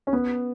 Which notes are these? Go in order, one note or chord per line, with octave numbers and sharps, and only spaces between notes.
C#4
B3